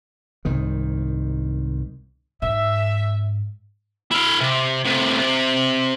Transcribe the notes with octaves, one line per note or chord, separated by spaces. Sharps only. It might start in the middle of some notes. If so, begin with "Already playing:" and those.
C2 G#2 D#3
G#2 E5
E4 F5
C3
A2 C3
C3